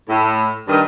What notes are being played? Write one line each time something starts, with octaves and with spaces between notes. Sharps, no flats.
A2
G2 D#3